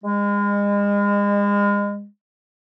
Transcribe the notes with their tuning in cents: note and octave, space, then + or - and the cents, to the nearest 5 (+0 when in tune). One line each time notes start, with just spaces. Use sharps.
G#3 -35